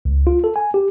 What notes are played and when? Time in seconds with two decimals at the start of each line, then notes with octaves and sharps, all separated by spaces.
0.05 C#2
0.27 F4
0.44 A4
0.56 G#5
0.74 G4